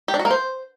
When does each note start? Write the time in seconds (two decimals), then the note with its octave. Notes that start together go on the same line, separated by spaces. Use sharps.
0.08 G4
0.14 D4
0.19 F#4
0.25 A#3
0.31 C5